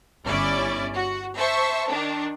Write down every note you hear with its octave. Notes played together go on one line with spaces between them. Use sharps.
G1 C#4 E4 D5
F#4
C5 E5 A5 C#6
D#3 D4